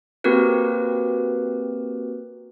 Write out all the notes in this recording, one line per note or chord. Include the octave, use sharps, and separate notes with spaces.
A#3 C4 F#4 G4 A#4 B4